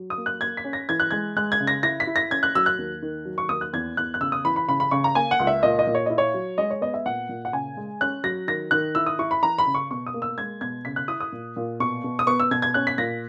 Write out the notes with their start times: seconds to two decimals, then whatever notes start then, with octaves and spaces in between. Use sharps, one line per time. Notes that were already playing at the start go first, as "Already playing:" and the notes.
Already playing: F#3
0.10 D#6
0.18 A#3
0.26 F#6
0.41 A#3 G#6
0.57 B6
0.64 C#4
0.73 A#6
0.89 E3 G#6
1.00 F#6
1.11 G#3 G#6
1.36 G#3 F#6
1.52 G#6
1.60 C#3
1.67 A#6
1.83 E4 A#6
2.00 B6
2.07 E4
2.16 A#6
2.30 C#4 G#6
2.43 F#6
2.55 F#3 E6
2.66 F#6
2.79 D#2
3.02 D#3
3.25 F#3
3.38 C#6
3.49 D#2 D#6
3.61 F#6
3.73 E2 G#6
3.97 E2 F#6
4.14 F#6
4.21 C#3 E6
4.32 D#6
4.45 E3 B5
4.56 B5
4.68 C#3 B5
4.80 B5
4.91 C#3 C#6
5.04 A#5
5.15 A#3 G#5
5.31 F#5
5.40 C#2
5.47 E5
5.63 A#2 D#5
5.79 D#5
5.87 A#2
5.95 C#5
6.06 E4 D#5
6.18 C#5
6.34 F#3
6.58 G#3 D#5
6.70 C#5
6.81 B3 D#5
6.94 E5
7.06 A#2 F#5
7.29 A#2
7.45 F#5
7.53 C#3 G#5
7.77 G#3
8.01 C#4 F#6
8.24 F#3 A#6
8.47 D#3 A#6
8.71 D#3 F#6
8.95 E4 E6
9.06 D#6
9.19 E4 C#6
9.31 B5
9.43 E3 A#5
9.58 B5
9.67 C#3
9.74 C#6
9.91 B2 C#6
10.06 D#6
10.14 A#3
10.22 E6
10.38 G#3 G#6
10.61 B2 G#6
10.85 C#3 B6
10.96 F#6
11.08 E4 D#6
11.20 D#6
11.32 A#2
11.57 A#2
11.80 B2 C#6
12.04 B2
12.19 D#6
12.27 B3 C#6
12.40 E6
12.51 B2 G#6
12.62 G#6
12.74 C#4 F#6
12.87 B6
12.98 A#2 A#6